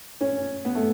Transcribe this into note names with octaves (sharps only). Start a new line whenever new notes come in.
C#4
B3
A3